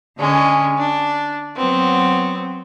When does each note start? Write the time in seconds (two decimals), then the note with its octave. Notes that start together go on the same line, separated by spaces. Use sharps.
0.17 D3 G#3 C#4
0.77 D4
1.56 F#3 B3 C4